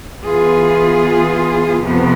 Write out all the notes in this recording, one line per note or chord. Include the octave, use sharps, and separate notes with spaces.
E3 B3 F4 G#4
F2 C3 F3 B3